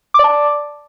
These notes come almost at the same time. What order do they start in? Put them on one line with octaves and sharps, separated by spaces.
D6 D5 A5